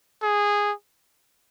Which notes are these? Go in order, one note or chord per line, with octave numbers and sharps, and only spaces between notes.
G#4